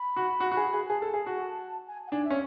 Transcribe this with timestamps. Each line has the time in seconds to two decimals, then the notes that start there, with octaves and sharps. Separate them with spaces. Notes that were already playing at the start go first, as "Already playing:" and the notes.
Already playing: B5
0.16 F#4
0.40 F#4
0.51 F#4
0.57 G#4
0.73 G#4
0.89 G#4 A5
1.02 A4
1.14 G#4
1.26 F#4
1.87 G#5
2.07 F#5
2.11 D4 G#5
2.25 E5
2.30 C#4